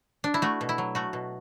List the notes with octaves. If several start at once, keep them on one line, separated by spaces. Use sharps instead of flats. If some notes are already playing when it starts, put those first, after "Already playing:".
D4
E4
A3 F#4
B2
E4
F#3
A3 F#4
B2